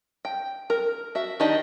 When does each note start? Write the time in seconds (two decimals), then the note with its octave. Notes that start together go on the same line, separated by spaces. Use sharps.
0.25 G5
0.70 A#4
1.15 F#4 E5
1.40 D#3 D4 D#4 G4 D#5